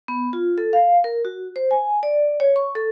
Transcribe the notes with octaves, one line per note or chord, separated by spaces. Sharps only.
B3
F4
A4
F5
A#4
F#4
C5
G#5
D5
C#5
C#6
A4